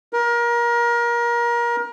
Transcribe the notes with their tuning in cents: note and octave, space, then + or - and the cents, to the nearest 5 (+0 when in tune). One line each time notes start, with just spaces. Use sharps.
A#4 +25